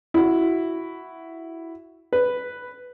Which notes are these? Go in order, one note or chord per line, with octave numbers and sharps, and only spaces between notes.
E4 F#4
B4